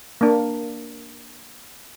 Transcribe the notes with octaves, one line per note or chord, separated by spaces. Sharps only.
A#3 D4